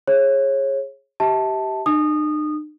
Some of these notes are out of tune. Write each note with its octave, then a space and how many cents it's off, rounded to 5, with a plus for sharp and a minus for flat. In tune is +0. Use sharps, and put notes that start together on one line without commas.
G#4 +0 C#5 -30
G4 -15 E5 -35 A5 +0
D#4 -45 D#6 -20